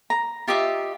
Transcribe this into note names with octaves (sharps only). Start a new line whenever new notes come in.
A#5
F4 G4 D#5 E5